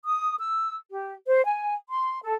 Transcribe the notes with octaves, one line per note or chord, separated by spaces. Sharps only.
D#6
E6
G4
C5
G#5
C6
A4